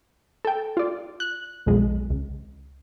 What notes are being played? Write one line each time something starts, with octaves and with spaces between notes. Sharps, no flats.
A4 G5
F4 D5
F#6
B1 F2 G#3
C#2